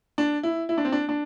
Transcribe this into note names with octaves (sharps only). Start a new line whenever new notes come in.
D4
E4
E4
D4
C4
D4
D4